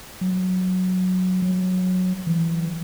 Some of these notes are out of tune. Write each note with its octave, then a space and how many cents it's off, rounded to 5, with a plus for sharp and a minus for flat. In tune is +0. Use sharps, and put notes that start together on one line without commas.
F#3 -5
F#3 -10
E3 +10